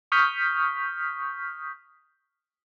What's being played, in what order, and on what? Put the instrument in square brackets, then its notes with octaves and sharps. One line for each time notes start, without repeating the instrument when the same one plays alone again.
[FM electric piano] C#6 D#6 F6 G6 B6